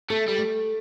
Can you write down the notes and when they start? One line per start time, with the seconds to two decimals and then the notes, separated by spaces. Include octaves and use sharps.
0.10 A3 A4
0.28 G3
0.38 A3